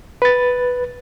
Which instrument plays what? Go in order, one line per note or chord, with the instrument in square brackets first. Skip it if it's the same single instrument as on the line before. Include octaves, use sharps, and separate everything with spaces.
[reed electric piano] B4 A6